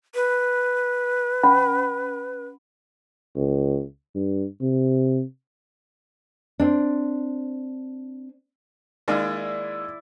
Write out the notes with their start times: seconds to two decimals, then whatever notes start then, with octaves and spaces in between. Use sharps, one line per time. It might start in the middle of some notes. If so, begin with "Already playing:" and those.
0.15 B4
1.43 C#4 F#5 B5
3.36 C#2
4.15 G2
4.61 C3
6.60 C4 D4
9.08 D#3 G#3 A#3 E4 D5